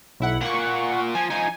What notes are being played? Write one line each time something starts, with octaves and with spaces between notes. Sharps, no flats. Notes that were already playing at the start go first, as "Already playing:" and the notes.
B1 E4 F#5
A#2 A#3 F#5 C#6
F3 G#5
F3 D#4 G#5